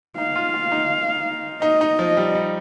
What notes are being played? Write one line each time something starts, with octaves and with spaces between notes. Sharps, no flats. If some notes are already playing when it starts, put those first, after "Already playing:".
D#4 F5
F4
F4
D#4
D#4 D#5
D#4
F3
G3
G3